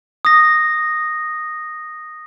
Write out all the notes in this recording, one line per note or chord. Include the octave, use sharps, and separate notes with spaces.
D#6 A#6